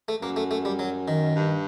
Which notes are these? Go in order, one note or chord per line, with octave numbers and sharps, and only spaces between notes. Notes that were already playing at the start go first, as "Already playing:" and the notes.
A3
F#2 A#3
A3
A3
G3
F#3
D#3
G2